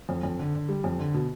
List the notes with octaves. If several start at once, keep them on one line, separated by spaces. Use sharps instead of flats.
F2
F2
D3
D3
G3
F2
D3
B2